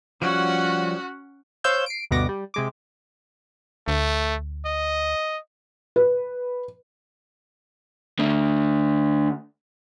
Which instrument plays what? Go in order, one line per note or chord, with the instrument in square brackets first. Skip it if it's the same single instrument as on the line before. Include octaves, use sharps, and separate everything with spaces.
[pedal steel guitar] F3 G3 C#5 [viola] C#4 F#5 [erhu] F#4
[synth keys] C5 C#5 F5 E6 G6
C7 D7
D2 G2 B2 B3 D6 A#6
G3
C3 G#3 D6
[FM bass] D2 [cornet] A3
[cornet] D#5
[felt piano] B4
[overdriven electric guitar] D2 D3